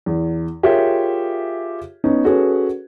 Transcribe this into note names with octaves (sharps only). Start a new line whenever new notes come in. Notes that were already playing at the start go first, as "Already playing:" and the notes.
E2
F4 G4 G#4 A#4 C#5 E5
B3 C#4 D#4
C#4 F#4 G#4 A4 B4 C#5